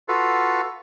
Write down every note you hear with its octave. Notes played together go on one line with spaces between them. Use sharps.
F4 F#4 A4 B4 F5